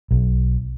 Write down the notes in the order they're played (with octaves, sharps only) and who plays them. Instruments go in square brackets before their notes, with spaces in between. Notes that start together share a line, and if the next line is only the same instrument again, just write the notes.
[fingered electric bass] B1